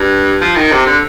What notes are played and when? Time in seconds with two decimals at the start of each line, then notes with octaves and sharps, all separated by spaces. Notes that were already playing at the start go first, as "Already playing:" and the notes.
Already playing: G2
0.41 F3
0.56 D#3
0.72 C3
0.86 D3